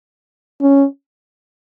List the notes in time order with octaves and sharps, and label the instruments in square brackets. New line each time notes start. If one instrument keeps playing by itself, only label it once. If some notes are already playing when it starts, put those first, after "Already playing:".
[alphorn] C#4